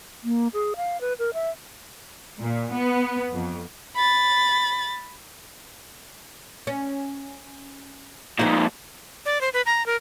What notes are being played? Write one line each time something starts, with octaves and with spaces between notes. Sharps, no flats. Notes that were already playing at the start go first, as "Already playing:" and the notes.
A#3
G#4
F5
B4
A#4
E5
A#2
B3
F2
B5 A6
C#4
F2 A#2 D#4 C5
D5
C5
B4
A#5
A#4